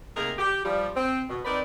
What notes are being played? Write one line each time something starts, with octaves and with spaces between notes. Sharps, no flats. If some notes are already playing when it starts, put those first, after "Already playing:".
C3 A3 A#3 D#4 G#4 A#4
G4
F3 G3
C4
B2
C4 D#4 A#4 B4 D5